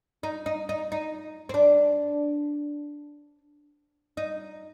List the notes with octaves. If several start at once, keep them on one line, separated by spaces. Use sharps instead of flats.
D#4
D#4
D#4
D#4
C4
D4
D#4